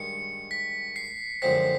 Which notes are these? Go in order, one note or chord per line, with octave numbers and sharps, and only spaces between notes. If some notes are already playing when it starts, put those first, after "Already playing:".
Already playing: G2 D#3 G#3 C#7
B6
C7
F#2 D3 F3 G#3 C4 B6